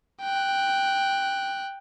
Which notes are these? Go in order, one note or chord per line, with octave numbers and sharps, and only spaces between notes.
G5 F#6